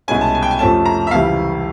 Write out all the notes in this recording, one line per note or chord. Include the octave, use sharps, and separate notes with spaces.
C2 B2 G#3 C#4 G#5
A5
G#5
G5
G#5
F2 C3 F3 A3 C#4 A5
A#5
E5
C#2 C3 E3 G3 F5